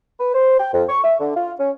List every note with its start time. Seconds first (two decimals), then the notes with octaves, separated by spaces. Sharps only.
0.20 B4
0.35 C5
0.59 G5
0.73 F2
0.89 C#6
1.04 E5
1.20 D3
1.36 F4
1.59 C#4